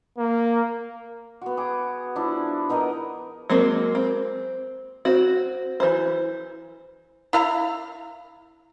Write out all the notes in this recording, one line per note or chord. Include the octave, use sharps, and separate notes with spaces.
A#3
B3 F#4
G#4 D6
F3 D4 E4
B3 D#4 A#4 D#5
F#3 G#3 A#3 C4
C4
C4 F#4
E3 C5
E4 F5 A#5